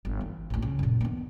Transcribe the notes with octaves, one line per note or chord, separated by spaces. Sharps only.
G1
E3
A1 D2
C#3
F#2 A#2
D#3 B3